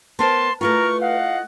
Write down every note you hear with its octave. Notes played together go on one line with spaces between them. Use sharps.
B3 A#4 C5 A5 C6
A3 E4 F4 A#4 B4 C#6
D#5 F5 F#5